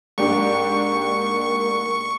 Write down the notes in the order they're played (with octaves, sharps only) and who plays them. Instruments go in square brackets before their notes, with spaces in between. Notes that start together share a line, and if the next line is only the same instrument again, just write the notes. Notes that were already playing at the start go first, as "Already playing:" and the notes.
[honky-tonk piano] G#2 D4 G4 [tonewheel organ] A#3 [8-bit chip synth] C#6